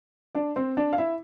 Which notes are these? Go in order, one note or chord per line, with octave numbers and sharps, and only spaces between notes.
D4 D5
C4 C5
D4 D5
F5
E4 E5